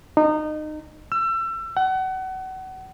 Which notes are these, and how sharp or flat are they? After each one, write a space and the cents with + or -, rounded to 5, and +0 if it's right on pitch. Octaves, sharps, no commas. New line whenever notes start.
D#4 -25
E6 +30
F#5 +30